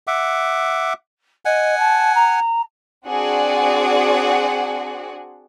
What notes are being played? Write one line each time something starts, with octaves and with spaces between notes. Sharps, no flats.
E5 F#5 D6
D#5 F#5 G#5
A5
A#5
C4 D4 F#4 G#4 D5 F#5